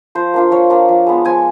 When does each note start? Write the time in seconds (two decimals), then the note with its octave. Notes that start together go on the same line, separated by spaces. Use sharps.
0.15 F3 C5
0.34 A#3 D4 F4
0.51 F3 C#5
0.70 A#3 D4 F4
0.89 F3
1.06 G#3 B3
1.25 F3 G#5